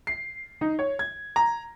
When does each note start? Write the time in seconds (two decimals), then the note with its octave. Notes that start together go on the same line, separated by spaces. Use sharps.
0.07 C7
0.61 D#4
0.79 C#5
0.99 G#6
1.36 A#5